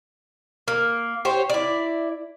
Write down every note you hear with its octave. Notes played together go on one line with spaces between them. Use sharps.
A#3
G4 C5 C#5
E4 D5